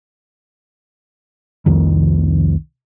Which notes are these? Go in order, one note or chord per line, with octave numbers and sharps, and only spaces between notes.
C2 F2 D#3